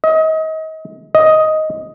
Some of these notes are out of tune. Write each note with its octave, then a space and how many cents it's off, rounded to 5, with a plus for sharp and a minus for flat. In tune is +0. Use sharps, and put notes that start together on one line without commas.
D#5 +30
D#5 +5